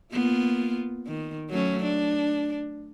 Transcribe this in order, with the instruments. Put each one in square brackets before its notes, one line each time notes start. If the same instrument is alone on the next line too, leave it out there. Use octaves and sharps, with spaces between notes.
[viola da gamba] A#3 B3 F4
D#3
F#3 A3 C#4
D4